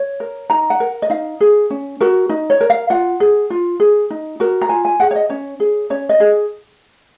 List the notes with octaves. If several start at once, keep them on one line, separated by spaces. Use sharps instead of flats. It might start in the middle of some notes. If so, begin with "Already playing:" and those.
Already playing: C#5
A#4
D#4 A#5
F#5
A#4
D#5
D#4 F5
G#4
C#4
F#4 A#4
D#4
C#5
A#4
F5
F4 F#5
G#4
F4
G#4
D#4
F#4 A#4
A#5
F4 G#5
G#5
G#4 F#5
C#5
D#5
C#4 C#5
G#4
C#4 C#5
D#5
G#4